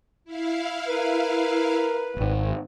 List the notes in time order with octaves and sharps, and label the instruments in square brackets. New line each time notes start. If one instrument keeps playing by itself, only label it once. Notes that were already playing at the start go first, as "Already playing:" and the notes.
[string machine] E4 F5
[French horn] A#4 [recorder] B4
[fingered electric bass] D#1 G#1